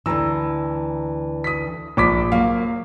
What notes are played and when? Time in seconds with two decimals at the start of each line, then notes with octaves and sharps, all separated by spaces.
0.06 D2 E3 A#5 E6
1.44 D#6 B6
1.97 A#1 D6 B6
2.32 F#3 A#3 F5